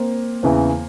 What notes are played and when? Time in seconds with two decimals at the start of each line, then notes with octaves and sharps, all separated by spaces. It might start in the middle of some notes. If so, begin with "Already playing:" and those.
Already playing: A#3 C4
0.43 E2 C#3 E3